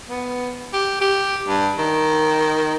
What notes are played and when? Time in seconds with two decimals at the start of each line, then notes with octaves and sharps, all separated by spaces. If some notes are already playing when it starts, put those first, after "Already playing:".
0.07 B3
0.73 G4
1.01 G4
1.46 G2
1.78 D#3